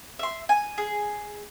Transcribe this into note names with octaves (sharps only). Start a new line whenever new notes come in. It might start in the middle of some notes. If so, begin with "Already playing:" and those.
E5 C6
G#5
G#4